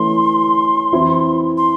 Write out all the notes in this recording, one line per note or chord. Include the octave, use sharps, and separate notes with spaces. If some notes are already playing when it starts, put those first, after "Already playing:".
Already playing: E3 A3 C#4 E4 C6
E3 C4 E4
C6